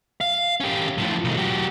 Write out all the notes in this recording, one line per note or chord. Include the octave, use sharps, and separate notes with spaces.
F5
C#4 G4
A2 F3
B1 D#3
F#3 G4